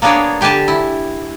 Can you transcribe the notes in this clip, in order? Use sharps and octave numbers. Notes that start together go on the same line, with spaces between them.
A#3 B3 D4 G#4 C#5 D5
D3 G4 B4 G#5 A5
E4